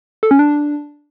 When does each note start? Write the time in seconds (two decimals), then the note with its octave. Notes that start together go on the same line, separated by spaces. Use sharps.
0.23 A4
0.31 C#4
0.39 D4